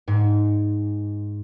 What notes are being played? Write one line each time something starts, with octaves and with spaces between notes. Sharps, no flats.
G#2